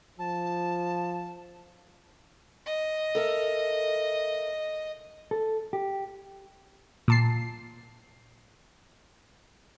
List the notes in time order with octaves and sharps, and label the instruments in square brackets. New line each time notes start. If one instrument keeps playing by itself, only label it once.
[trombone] F3 [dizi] A5
[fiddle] D#5
[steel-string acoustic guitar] A4 A#4 E5
[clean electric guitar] A4
G4
[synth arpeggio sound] A#2 A5 C7